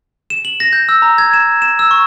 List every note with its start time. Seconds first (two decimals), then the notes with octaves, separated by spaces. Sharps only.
0.30 E7
0.45 F#7
0.60 A#6
0.73 G6
0.89 E6
1.02 A#5
1.18 G#6
1.34 E7
1.62 E7
1.79 E6
1.91 C#6